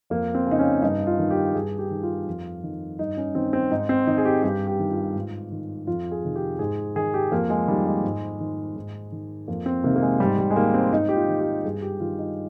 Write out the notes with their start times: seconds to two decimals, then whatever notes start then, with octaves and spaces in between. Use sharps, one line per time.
0.10 F2 A#3
0.35 C4
0.47 C#3 D#4
0.59 C#4
0.82 G2 D#4
1.07 F4
1.19 D#3
1.31 G4
1.55 G2 G#4
1.79 G4
1.91 D#3
2.03 F4
2.27 F2
2.63 D#3
2.99 G2 D#4
3.17 C#4
3.35 D#3 C4
3.53 C4
3.71 G#2 D#4
3.89 C4
4.07 D#3 D#4
4.18 G#4
4.25 G4
4.43 G2 G4
4.67 G4
4.79 D#3
4.91 F4
5.15 G#2
5.52 D#3
5.87 F2 F4
6.12 G#4
6.24 C3 D#3
6.36 G4
6.59 G#2 G#4
6.96 D#3 G#4
7.14 G4
7.32 F2 A#3
7.50 G#3
7.68 D#3 G3
7.86 G#3
8.04 G#2
8.40 D#3
8.76 G#2
9.12 D#3
9.48 F2 A#3
9.66 C4
9.84 C3 D#3 A#3
9.96 A#3
10.02 G#3
10.20 G#2 G3
10.38 G3
10.51 G#3
10.56 D#3 A#3
10.74 C4
10.92 G#2 D#4
11.09 G4
11.16 F4
11.28 D#3
11.40 G4
11.64 G2 G#4
11.82 G4
12.00 D#3 F4
12.19 D#4